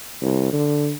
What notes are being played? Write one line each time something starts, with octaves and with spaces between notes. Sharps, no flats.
C2
D3